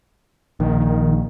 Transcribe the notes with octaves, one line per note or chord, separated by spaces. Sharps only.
A#1 D#3